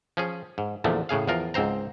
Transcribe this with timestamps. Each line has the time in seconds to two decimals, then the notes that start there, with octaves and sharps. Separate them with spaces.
0.17 F3 C#4 G#4
0.58 G#2
0.84 E2 A#2 D3 F3 A3
1.09 A2 C#3 G#4 F5
1.27 E2 F3 F4 A#4
1.54 C#2 G#2 C4 C5 A#5